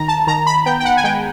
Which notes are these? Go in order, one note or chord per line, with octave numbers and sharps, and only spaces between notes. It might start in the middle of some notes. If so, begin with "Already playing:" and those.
Already playing: D#3 A#5
A5
D#3 A#5
B5
B3 G5
G5
F#5
G#5
G#3 G5